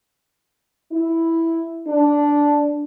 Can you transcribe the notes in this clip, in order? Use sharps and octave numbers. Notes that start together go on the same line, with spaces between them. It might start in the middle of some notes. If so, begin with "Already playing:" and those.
E4
D4